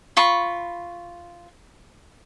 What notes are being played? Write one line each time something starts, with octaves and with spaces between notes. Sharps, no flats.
F4 B5 C#6